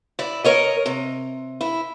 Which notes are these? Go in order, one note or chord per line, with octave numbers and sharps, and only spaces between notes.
E4 D5
A#4 C#5 D#5
C3
E4